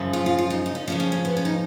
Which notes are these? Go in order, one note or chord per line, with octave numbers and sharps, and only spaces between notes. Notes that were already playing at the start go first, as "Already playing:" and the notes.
Already playing: F#2 C#3 F3
F4
F4
F4
D#4
D#4
C#4
F2 C#3 F3 C#4
C#4
C#4
B3
C#4
D#4